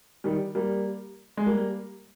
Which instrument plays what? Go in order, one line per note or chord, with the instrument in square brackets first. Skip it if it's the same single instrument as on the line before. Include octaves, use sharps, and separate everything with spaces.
[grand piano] D#3 G3
G3 A#3
G#3
G3 A#3